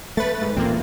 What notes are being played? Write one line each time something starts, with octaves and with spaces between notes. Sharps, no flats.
A3 B4 A6
G#2
A1 E2 A#2 A#3 C4